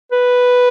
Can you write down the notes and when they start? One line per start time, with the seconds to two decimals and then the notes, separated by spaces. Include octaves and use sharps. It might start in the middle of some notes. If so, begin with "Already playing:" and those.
0.12 B4